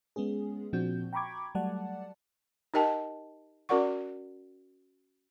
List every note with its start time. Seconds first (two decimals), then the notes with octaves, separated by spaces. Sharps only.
0.16 G#3 B3 C#4 G#4
0.73 A#2 F3 C4 D4 F#4 G6
1.13 G5 A#5 B5 C#6 D6 G#6
1.55 F#3 G3 A3 D5 F#5 A5
2.74 D#4 G4 A#4 D#5 G5 A5
3.69 C#4 F#4 A#4 D5 F#5 C#6